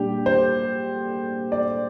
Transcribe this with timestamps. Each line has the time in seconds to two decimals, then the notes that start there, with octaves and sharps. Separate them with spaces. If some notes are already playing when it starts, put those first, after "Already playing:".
Already playing: A#2 G3 D4 G4
0.26 C5
1.52 D5